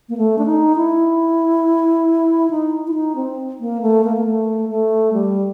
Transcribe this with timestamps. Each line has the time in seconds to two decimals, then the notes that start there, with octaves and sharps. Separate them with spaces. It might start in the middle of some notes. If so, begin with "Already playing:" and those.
0.09 A#3
0.17 A3
0.39 D4
0.46 D#4
0.76 E4
2.51 D#4
2.87 E4
2.94 D#4
3.16 C4
3.60 A#3
3.82 A3
4.04 A#3
4.17 A#3
4.25 A3
4.69 A3
5.13 G3